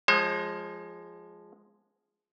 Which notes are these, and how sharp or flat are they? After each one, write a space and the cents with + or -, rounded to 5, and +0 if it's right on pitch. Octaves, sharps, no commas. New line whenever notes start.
F3 +0 G#3 +0 C5 +45